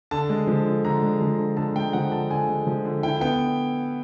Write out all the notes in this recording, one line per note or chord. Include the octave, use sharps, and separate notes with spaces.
D3 A5
G#3
F3
D3
D3 A#5
G#3
F3
D3
D3 A5
G#3 G5
F3 F#5
D3 A5
D3 G#5
G#3
F3
D3
E4 G5
B3 G5